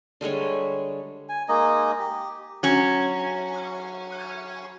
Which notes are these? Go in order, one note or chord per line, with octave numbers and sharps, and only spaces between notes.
D3 G3 G#3 C#5
G#5
G#3 A#3 D#4 D#5
G4
F#3 C#4